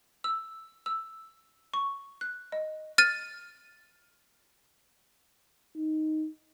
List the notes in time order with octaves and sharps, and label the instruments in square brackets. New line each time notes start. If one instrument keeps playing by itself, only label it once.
[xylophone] E6
E6
C#6
F#6
D#5
F6 A6 D#7
[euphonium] D#4